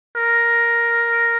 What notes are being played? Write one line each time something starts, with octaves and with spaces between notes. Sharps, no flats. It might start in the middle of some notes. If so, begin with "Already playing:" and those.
A#4